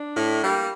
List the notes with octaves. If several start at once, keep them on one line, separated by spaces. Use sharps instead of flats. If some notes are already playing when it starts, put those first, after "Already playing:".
Already playing: D4
A2
G3 A#3